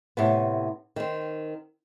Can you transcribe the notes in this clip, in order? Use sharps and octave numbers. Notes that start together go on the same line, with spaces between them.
A2 C3 B3
D#3 C4